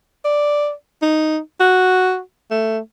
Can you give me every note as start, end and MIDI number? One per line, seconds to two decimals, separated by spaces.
0.25 0.71 74
1.02 1.39 63
1.60 2.19 66
2.51 2.79 57